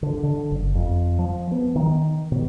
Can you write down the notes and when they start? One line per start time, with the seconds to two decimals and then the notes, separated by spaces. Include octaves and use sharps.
0.03 D3
0.23 D3
0.51 F#1
0.75 F2
1.19 F3
1.51 B3
1.75 D#3
2.32 B2